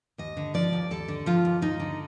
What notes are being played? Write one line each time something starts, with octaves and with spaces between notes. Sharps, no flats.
D#2 D#5
D3
F3 D5
D#2
D#2 A4
D3
F3 F4
D#2
D#2 D#4
D3